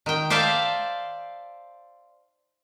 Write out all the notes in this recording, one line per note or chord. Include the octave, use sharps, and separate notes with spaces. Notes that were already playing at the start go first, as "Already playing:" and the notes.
D#3 G5
C5 D5 E5 F5 G5 A5